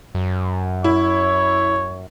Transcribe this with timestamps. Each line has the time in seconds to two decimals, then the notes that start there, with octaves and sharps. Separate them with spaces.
0.15 F#2
0.84 E4 C#5